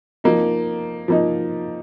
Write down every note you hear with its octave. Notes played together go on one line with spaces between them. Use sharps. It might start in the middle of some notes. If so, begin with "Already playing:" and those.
F3 A#3 D#4
F3 A#3 D#4